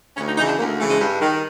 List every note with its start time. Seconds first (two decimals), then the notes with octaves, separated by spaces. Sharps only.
0.17 D2 C#4
0.27 D#4
0.38 C#3 E3 D#4
0.48 D4
0.58 D2 A#3
0.68 A3
0.79 C#3 E3 A3
0.90 G#3
1.00 G2
1.21 D#3